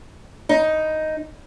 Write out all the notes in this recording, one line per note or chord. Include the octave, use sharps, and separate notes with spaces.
D#4